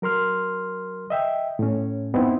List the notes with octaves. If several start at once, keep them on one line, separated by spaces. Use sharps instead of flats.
F#3 A#4 C6 F6
D#5 E5 G5
A2 C#4
F#2 B3 C4 D#4 E4